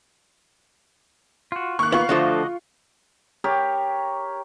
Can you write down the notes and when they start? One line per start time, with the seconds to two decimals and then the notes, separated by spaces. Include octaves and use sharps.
1.52 F4 F#4
1.79 D#3 A#3 C#6 F#6
1.92 B3 F4 F5 C#6
2.09 D3 F3 A3 F#4 D#5 D6
3.44 G4 A#4 C#5